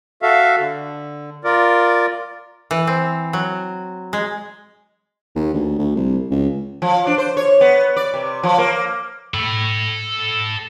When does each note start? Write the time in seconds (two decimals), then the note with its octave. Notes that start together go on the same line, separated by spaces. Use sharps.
0.22 F#4 A4 E5 F5
0.59 D3
1.44 F4 A#4 D5
2.71 E3
2.87 C4
3.33 F#3
4.13 G#3
5.35 D#2
5.53 D2
5.79 D2
5.96 C2
6.31 C#2
6.82 F3
7.07 D4
7.18 C5
7.37 C#5
7.61 B3
7.96 D5
8.14 C3
8.43 F3
8.58 A#3
9.34 A4 B5